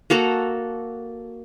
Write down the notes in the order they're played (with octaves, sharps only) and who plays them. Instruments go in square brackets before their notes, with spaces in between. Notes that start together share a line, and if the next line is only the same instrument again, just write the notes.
[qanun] A#3 F#4 A4 A#5